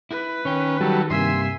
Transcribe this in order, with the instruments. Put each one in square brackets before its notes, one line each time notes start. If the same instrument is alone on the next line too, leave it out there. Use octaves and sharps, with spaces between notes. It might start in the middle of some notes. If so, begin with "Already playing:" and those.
[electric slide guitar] E4 [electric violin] B4
[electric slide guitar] D#3 G5 [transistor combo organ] C#4
[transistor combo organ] F#3 G3 A4
[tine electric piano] G2 C3 A#3 [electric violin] E5 G#5 [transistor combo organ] C6